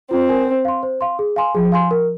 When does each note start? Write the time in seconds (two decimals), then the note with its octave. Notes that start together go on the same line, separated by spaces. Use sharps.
0.11 C4 F4
0.29 A#4 G#5
0.47 C5
0.65 F5 C6
0.83 C5
1.01 F5 C6
1.19 G#4
1.36 F5 G#5 C6
1.54 F3 G#4
1.72 F5 G#5 C6
1.91 A#4